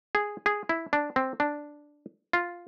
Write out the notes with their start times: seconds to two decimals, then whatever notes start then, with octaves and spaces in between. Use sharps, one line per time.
0.15 G#4
0.46 G#4
0.69 E4
0.93 D4
1.16 C4
1.40 D4
2.33 F4